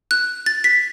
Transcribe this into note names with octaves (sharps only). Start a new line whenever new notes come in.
F#6
A6
B6